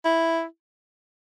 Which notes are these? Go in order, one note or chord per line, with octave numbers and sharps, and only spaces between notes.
E4